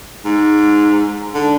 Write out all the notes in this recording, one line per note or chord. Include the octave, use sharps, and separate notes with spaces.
G#2
D3